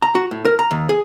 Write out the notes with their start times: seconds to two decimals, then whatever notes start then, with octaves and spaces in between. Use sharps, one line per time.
0.02 A#5
0.15 F#4
0.31 A2
0.45 A#4
0.59 A#5
0.71 D#2
0.89 G#4